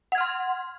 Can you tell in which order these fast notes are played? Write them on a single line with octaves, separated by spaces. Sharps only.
F#5 G#6 F6 C6